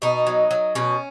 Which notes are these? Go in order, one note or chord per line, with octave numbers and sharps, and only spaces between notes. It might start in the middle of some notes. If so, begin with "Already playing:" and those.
B2 D#4
F#3
F#3
B2 C#4